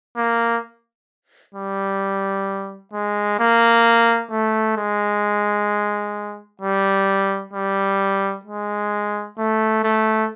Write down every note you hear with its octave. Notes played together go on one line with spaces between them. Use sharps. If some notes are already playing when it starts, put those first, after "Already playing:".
A#3
G3
G#3
A#3
A3
G#3
G3
G3
G#3
A3
A3